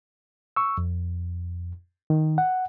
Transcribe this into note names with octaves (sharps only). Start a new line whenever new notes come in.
C#6 E6
F2
D#3
F#5